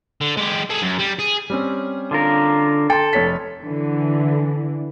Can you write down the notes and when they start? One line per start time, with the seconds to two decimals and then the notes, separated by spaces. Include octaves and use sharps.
0.21 D3
0.37 G#3 G4
0.70 G#4 A4
0.82 F#2
0.99 G3
1.19 G#4
1.50 G3 C4 C#4
2.11 D3 F4 A#4
2.90 A4 G5 C6
3.13 F1 C#5 B6
3.64 D3 E3